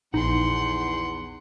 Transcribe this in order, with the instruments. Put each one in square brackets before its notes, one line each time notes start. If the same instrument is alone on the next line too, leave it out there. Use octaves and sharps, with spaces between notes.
[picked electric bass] A#1 [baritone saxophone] E2 [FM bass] D#4 [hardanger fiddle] F#5 C6